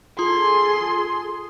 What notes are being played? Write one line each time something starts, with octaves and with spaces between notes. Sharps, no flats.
F4 G#4 A4 C6 D#6